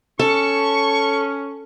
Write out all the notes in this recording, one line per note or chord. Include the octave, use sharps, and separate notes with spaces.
C#4 A4 C#6